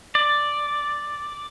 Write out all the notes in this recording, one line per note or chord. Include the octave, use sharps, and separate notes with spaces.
D5